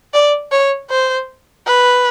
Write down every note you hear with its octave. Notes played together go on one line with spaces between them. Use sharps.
D5
C#5
C5
B4